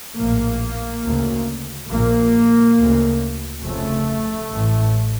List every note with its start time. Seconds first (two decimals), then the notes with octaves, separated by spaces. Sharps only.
0.18 A#1 A2 A#3
1.05 D2 C#3
1.90 A#1 A#2 A#3
2.78 D2 C#3
3.64 F1 F2 C#3 A3
4.50 A1
4.55 A2